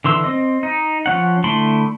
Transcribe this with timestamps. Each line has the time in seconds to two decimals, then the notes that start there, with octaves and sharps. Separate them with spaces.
0.04 D3 E3 C6 E6
0.24 C4 D#5
0.63 D#4
1.06 F3 C#4 F#5
1.44 D3 A3 E4 B5 C6